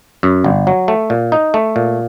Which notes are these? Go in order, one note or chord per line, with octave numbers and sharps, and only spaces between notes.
F#2
G1
F#3
A3
A#2
D#4
A3
A#2